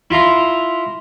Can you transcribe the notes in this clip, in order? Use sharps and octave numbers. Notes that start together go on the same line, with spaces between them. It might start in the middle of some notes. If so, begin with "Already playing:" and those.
E4 F4 A#5 C6